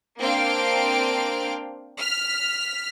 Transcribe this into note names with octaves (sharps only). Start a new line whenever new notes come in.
A#3 C4 D4 F5 G5 D7
F6 B6